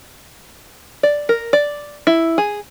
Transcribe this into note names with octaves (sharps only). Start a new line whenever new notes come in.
D5
A#4
D5
E4
G#4